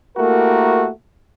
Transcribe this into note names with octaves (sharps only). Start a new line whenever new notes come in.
A3 A#3 E4 F#4 G4 A#4